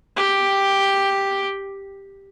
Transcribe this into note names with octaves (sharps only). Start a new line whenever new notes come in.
G4 G5